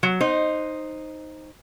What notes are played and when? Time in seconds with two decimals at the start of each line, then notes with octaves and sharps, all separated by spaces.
0.03 F#3
0.21 D#4 C5